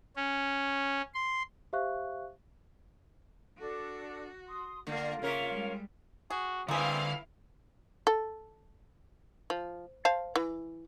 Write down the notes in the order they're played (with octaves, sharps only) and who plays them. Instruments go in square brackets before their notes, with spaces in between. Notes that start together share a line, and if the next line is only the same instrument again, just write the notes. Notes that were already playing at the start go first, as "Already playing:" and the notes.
[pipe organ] C#4
C6
[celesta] G4 C5 E5 F5 C#6 F#6
[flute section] D4 A4 [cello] F#4
[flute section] C6 D#6
[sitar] D3 [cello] A#3 [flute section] F4 F5
[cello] C#3 E5 [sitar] A#3 C#4 A#4
[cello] G3 G#3
[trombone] F#4 [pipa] G#4
[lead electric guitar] D3 B4 [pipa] A#3 G#4 [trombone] C4 [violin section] E4 F5
[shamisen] A4
F3
C5 F5 A5
E3